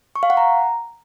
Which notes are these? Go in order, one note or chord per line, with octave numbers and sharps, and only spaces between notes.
C#6
F5
F#5
A#5